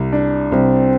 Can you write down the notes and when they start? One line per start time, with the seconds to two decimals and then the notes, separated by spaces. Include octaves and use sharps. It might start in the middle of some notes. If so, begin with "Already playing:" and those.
Already playing: C2
0.13 D4
0.52 C2 C4